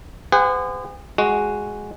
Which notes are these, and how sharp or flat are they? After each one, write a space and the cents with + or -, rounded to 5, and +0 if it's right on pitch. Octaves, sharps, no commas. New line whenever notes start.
G#4 -40 C5 -45 F#5 -5
G#3 +0 F#4 +0